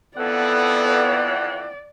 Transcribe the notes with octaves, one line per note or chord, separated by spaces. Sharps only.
F2 E3 B3 A4 D5 F#5